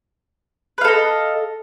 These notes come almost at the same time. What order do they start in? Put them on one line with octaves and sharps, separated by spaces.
B4 F5 A4 D#5